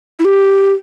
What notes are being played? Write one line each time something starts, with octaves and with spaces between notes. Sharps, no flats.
E4
G4